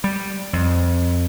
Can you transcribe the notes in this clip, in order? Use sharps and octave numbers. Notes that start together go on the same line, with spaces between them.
G3
F2